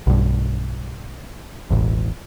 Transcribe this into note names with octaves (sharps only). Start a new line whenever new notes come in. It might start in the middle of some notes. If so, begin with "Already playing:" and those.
B1 G2
E1 A1 E2